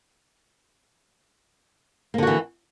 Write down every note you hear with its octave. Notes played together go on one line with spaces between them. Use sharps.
D3 E3 A#3 F#4